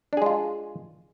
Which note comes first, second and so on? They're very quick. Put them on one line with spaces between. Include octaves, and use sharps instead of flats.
D4 G#4 G#3 F4